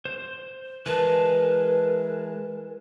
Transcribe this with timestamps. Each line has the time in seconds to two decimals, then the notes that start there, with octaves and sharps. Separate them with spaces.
0.05 C5
0.86 E3 G#3 A#4 B4 A5